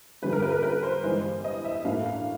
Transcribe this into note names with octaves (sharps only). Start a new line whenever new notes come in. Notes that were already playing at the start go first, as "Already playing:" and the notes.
G2 D3 G3 B4
A#4
B4
A#4
B4
C5
G2 E3 G#3
D#5
E5
A2 F#3 A#3 D4 F5
F5